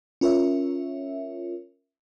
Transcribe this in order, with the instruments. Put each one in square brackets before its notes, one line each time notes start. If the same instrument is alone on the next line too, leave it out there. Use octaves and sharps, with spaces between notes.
[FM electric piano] C#4 F4 A#4 C#5 E5